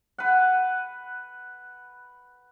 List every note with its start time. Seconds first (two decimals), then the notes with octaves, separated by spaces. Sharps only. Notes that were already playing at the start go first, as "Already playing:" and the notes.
0.18 B4 F#5